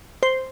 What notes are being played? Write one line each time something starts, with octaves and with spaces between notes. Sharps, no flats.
C5